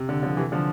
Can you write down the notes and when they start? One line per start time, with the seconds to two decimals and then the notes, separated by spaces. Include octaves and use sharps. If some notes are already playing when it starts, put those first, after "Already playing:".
Already playing: C3
0.09 D3
0.23 D3 F3
0.37 C3 E3
0.52 D3 F3